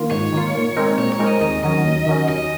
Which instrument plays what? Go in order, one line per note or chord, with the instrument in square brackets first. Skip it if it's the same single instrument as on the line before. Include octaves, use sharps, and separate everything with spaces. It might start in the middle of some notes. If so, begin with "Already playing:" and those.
Already playing: [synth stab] D#3 A#3 F4
[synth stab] G#2 [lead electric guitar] C#5
[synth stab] D#3 A#3 F4
A#2
G#3 C4 D#4 A#4
[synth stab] A#2 [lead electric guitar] C#5
[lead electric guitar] C#5
[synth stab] G#3 C4 D#4 A#4
[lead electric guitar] D#5
[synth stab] D#2 [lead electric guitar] D#5
[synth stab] D#3 F#3 C#4 [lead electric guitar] D#5
[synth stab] D#2
D#3 F#3 C#4
[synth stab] D#2 [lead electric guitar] D#5